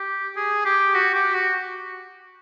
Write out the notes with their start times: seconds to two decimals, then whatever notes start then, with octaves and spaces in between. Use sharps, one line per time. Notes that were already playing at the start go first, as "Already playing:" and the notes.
Already playing: G4
0.36 G#4
0.65 G4
0.95 F#4
1.14 G4
1.34 F#4